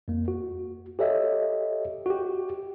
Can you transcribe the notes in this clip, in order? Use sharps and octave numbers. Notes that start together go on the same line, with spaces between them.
F2 A#3
F#4
G4 A4 C#5 D#5 E5
F#4 G4